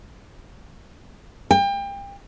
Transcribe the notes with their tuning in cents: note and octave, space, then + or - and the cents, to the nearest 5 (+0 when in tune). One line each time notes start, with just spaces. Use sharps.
G5 +30